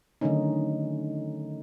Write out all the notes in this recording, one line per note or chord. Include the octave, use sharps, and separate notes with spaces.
D3 D#3 F#3 A3 C#4 D#4